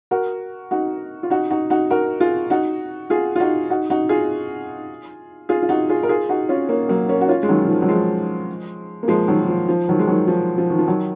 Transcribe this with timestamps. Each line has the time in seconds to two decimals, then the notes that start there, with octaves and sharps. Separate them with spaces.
0.11 F#4 A#4
0.71 D#4 F#4
1.23 F4
1.30 D#4 F#4
1.50 D#4 F#4
1.70 D#4 F#4
1.90 F#4 A#4
2.20 F4 G#4
2.50 D#4 F#4
3.10 F4 G#4
3.36 F4
3.40 D#4 F#4
3.70 D#4 F#4
3.90 D#4 F#4
4.09 F4 G#4
5.49 F4 G#4
5.62 F4
5.69 D#4 F#4
5.89 F4 G#4
6.03 A#4
6.09 F4 G#4
6.29 D#4 F#4
6.49 C#4 F4
6.69 A#3 C#4
6.89 F#3 A#3
7.09 A#3 C#4
7.21 F#4
7.29 C#4 F4
7.43 G#3
7.49 D#3 F#3
7.64 D#3
7.69 F3
7.82 F#3
7.89 F3 G#3
9.03 A#3
9.08 F3 G#3
9.28 D#3 F#3
9.49 F3
9.69 F3
9.88 D#3 F#3
9.99 G#3
10.08 D#3 F#3
10.28 F3
10.58 F3
10.70 D#3
10.79 F3
10.88 D#3 F#3